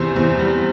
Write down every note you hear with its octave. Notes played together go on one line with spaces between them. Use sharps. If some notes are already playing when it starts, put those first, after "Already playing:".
Already playing: E2 C3 G3 C5
E2
G3